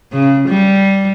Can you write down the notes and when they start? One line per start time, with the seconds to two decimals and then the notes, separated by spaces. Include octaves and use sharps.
0.12 C#3
0.49 G3